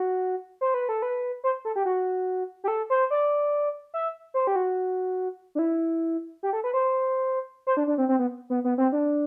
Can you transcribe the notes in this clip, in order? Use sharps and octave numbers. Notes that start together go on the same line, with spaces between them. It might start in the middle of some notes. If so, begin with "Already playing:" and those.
Already playing: F#4
C5
B4
A4
B4
C5
A4
G4
F#4
G4
A4
C5
D5
E5
C5
G4
F#4
D4
E4
G4
A4
B4
C5
C5
D4
D4
C4
C4
B3
B3
B3
C4
D4